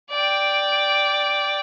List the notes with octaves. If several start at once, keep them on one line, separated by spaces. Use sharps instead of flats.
D5 G5